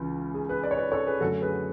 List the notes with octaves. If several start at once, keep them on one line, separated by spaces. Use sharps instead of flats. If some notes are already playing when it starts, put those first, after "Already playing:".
Already playing: C#2 C#3 E3
G#4
G#4 B4
B4 D5
C#5
B4 D5
A4 C#5
G#4 B4
F#2 D3 A3 C#4 F#4 A4
G#4 B4